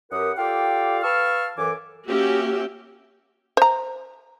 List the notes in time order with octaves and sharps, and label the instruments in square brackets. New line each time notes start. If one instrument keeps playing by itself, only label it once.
[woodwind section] F#2 G4 A#4 B4 F#5 D#6
F4 G4 A4 D5 F5 G5
B4 F5 A5 C#6 E6 F6
F#2 E3 A4 G#5 D6
[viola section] A#3 C#4 F#4 G4 E5
[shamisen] C5 A#5